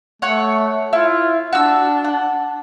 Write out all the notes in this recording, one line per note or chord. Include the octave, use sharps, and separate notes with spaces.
A3 C#5 F#5 C#6
E4 F4
D4 F#4 E6
F#5